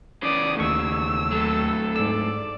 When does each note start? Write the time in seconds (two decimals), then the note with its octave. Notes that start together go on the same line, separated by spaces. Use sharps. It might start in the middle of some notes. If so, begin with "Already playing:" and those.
0.23 C#3 E3 D5 D#6
0.60 D#2 A3 C#6 E6
1.31 A2 F#3 A4
1.96 G#2 D5 E6